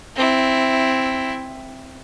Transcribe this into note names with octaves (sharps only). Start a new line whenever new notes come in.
C4 E4